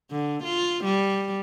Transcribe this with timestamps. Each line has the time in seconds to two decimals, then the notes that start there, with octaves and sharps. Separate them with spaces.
0.11 D3
0.44 F4
0.84 G3